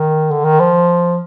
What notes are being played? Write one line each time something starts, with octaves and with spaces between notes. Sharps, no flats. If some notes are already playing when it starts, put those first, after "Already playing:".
Already playing: D#3
D3
D#3
F3